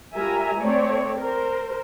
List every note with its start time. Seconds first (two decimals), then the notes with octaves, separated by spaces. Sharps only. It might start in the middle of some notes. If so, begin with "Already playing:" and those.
0.16 G3 F4 A#4 E5 G#5 A#5
0.59 A3 C4 C#5 D5
1.19 A#4 C5